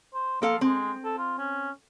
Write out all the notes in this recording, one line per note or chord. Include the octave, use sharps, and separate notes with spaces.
C5
F3 A#3 A4 F5
G#3 C4
A4
F4
C#4